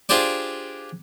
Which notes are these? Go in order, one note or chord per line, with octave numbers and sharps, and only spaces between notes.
D4 F4 G4 G#4 C5 D5